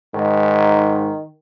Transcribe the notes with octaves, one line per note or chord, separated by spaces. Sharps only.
G#2 D#3